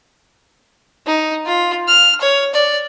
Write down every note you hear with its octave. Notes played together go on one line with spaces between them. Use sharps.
D#4
F4
F6
C#5
D5